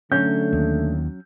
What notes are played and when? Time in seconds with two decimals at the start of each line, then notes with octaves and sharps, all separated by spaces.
0.12 D3 F#3 A3 C#4 G6
0.53 D#2